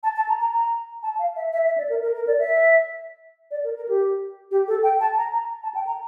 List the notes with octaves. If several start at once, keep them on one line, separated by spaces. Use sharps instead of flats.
A5
A5
A#5
A#5
A#5
A5
F5
E5
E5
E5
D5
A#4
A#4
A#4
D5
E5
D5
A#4
A#4
G4
G4
A4
G5
A5
A#5
A#5
A5
G5
A#5